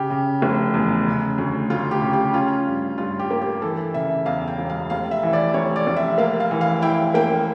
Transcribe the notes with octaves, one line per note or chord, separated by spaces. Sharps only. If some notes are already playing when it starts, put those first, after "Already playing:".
Already playing: C#3 G4
C#3
F1
E2
C#3
D2
D2 F4
G4
C#3
G4
C#4 F4
G2
G2 F4
G4
A#3
G4
E3 A4
C#3 E5
E2 F5
G5
E1
F5
F1 F5
E5
E3
D5
F1 C#5
D5
F1
E5
A#3 F5
F5
E3
F5
E4 G5
A#3 G5